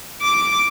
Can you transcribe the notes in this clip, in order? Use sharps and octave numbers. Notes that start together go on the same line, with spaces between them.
D6